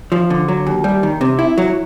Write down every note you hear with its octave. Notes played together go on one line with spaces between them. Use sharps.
F3
D3
F#3
D#2
G3
D#3
C3
E4
F#3